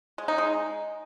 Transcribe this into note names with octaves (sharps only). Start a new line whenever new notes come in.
G#3
D#4
G#3